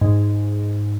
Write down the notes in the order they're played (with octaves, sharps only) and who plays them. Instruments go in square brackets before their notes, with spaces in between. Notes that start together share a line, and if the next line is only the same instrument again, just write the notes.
[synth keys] G#2